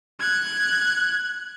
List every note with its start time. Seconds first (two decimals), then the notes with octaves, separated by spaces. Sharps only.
0.20 F#6 G#6